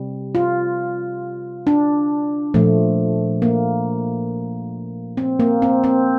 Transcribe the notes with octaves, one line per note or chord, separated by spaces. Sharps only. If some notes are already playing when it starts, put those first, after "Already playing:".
Already playing: C3 G3
F4
D4
A#2 F3 A3
A#3
C4
A#3
C4
C4